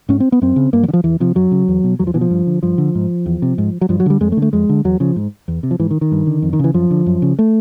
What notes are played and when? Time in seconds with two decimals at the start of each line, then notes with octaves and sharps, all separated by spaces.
0.09 G#2 C#4
0.20 C4
0.32 B3
0.41 F#2 C4
0.56 C#3
0.73 G2 A#3
0.83 F#3
0.88 D3
0.93 F3
1.04 E2 E3
1.20 C3 F3
1.35 F#2 F#3
1.52 C#3
1.68 E2
1.84 B2
1.99 E2 F#3
2.07 F3
2.14 B2 E3
2.21 F3
2.31 G2
2.47 D3
2.63 G2 F3
2.78 D3
2.95 G#2
3.26 E2
3.42 C3
3.58 G#2
3.81 F#3
3.89 G2 F3
4.00 F#3
4.06 D3 G3
4.21 F2 G#3
4.32 A3
4.37 D3
4.42 A3
4.53 F2 G#3
4.69 D3
4.85 E2 F#3
5.00 C#3 F3
5.16 G#2
5.48 E2
5.63 C3
5.71 F3
5.79 G#2 E3
5.91 D#3
6.01 D#3
6.12 G2
6.27 D3
6.42 F2
6.53 D#3
6.59 C#3 E3
6.74 F#2 F3
6.91 D3
7.06 F#2
7.22 C#3
7.39 A3